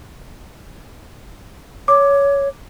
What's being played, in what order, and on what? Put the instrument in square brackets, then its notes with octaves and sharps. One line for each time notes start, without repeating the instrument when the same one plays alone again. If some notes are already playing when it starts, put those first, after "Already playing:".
[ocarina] C#5 [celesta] D6